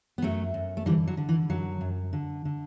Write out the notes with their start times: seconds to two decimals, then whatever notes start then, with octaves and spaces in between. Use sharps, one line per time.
0.18 B3
0.22 F#2 F#3 A3
0.54 F#2
0.77 A3
0.86 D3 E3 G3
1.08 F#3
1.17 D3
1.29 E3
1.49 F#2 F#3
1.81 F#2
2.13 D3
2.45 D3